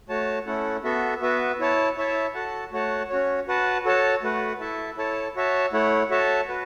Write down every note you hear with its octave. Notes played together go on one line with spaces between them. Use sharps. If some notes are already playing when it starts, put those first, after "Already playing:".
A3 F#4 C#5 A5
A3 C#4 E4 A4 F#5
B3 F#4 A4 E5
B3 F#4 B4 E5
E4 C#5 A5
E4 C#5 E5 A5
F#4 A4 F#5 A5
A3 F#4 C#5 F#5 A5
C#4 F#4 C#5
F#4 B4 F#5 A5
F#4 A4 C#5 A5
A3 F#4 B4 F#5
E4 A4 E5 A5
E4 A4 C#5 A5
F#4 C#5 E5 A5
A3 E4 C#5 F#5
F#4 A4 C#5 E5 A5
F#4 B4